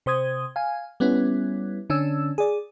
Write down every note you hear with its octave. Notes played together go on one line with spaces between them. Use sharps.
C3 C5 D#6 G#6
F5 G#5
G3 B3 C#4 E4
D3 C#4 D4 E6
G#4 D5